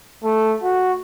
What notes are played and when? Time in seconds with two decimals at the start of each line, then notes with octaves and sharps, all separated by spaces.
0.24 A3
0.63 F#4